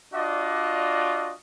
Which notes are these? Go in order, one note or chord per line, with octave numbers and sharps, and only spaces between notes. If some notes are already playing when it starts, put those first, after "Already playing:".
D4 F4 F#4 D5 D#5